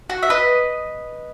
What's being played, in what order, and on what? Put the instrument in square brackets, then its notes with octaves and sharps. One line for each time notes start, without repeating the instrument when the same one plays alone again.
[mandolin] F#4
E5
B4 D#5